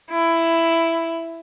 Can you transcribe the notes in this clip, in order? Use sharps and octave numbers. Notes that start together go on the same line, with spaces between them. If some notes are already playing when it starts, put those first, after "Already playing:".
E4